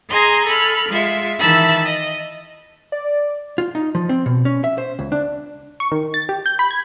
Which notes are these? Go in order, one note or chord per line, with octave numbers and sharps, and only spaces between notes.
G#4 D#5 G#5 A#5 C6
A4 B5 F6
G#3 F4 E5
D#3 E3 E5 A5 B5 E6
D#5
D5
F4
D#4
F3
C4
B2
C#4
E5
C5
C#2
D4
C#6
D#3
A6
G4
G6
B5
G#6